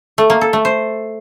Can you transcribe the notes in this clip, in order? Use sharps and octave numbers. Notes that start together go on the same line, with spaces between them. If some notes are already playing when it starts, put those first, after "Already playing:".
A3
A#3
A4
A3
C5